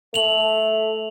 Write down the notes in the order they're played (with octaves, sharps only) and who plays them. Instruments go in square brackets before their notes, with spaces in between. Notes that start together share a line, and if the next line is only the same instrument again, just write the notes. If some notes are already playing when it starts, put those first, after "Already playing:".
[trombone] A3 [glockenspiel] F7 F#7